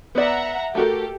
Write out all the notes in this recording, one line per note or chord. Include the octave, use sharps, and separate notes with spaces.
B3 D5 E5 F#5 A#5
A3 F#4 G4 A4 A#4